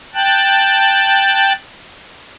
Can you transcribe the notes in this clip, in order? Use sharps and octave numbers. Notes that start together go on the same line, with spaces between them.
G5 A5 F#6